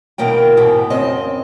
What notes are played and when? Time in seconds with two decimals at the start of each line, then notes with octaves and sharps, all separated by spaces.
0.18 D#2 B2 E3 A#3 G5
0.57 G#2 B2 B3
0.90 F2 C#3 C4 D#5